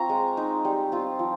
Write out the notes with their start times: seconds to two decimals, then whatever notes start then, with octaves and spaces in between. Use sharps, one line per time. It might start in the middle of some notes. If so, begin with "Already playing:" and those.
Already playing: C4 F4 A#5 C#6
0.09 G#3
0.37 D#4
0.65 G3
0.92 C4 F4
1.19 F3